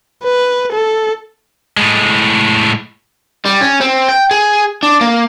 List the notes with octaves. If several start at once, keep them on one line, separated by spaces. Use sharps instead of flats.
B4
A4
A2 G#3
G3
C#4
C4
G5
G#4
D4
A#3